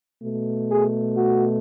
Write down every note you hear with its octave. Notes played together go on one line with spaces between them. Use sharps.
B2 A3
G#4
F#4